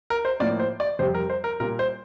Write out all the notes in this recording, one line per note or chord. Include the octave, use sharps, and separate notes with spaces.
A#4
C5
A2 F3 A#3 D5
C5
D5
F2 C3 G3 C5
A#4
C5
A#4
A#2 G3 A#3 A#4
C5